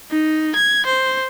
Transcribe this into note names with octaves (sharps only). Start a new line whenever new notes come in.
D#4
G#6
C5